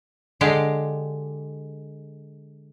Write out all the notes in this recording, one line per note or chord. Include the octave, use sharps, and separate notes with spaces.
D3 G#3 G4